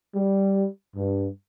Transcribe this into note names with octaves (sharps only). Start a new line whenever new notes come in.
G3
G2